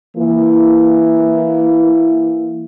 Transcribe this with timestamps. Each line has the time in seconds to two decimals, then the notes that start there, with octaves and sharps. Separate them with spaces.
0.17 E3 A#3 E4